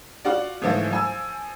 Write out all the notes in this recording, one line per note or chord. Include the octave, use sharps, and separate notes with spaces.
F4 F#4 D5
G#2 D3 E3 F3 A3
F3 G#5 E6